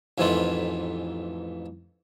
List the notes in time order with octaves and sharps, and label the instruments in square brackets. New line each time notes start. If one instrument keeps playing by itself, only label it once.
[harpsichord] A1 F2 G#2 E3 A3 F4